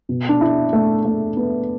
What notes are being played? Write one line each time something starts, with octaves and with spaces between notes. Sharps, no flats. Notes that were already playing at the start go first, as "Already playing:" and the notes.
B2
D4
E4
A3
A3
B3